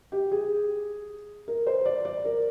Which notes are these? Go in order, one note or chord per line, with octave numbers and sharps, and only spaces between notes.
G4
G#4
A#4
C5
D5
D5
A#4